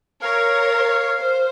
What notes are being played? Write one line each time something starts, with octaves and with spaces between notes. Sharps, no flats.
A#4 C#5 F5
C5